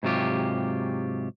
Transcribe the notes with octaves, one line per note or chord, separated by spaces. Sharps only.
G#2 C3 F#3 F4 G4